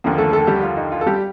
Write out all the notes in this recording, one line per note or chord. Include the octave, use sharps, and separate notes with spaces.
D#2 D3 F3 A#3
A3 A4
A3 A4
G3 G4
F4
D#4
F4
A4
G3 G4